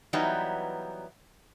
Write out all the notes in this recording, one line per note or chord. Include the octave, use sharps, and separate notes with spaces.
E3 F#3 G3 B3 D#4